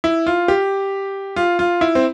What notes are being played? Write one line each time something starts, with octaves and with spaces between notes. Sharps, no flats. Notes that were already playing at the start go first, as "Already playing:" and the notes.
E4
F4
G4
F4
F4
E4
C4